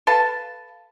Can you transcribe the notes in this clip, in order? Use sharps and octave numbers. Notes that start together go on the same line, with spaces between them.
A4 B4 F5 A5